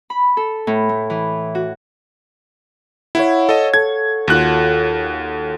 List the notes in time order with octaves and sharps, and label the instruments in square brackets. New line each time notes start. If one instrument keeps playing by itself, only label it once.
[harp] B5
A4
A2
A3
E3
F#4
[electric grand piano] E4 [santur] C#5 F5 F#5
[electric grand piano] A4 D#5
[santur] A4 [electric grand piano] G#6
[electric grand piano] D#2 F#6 [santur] F4 F#4 A4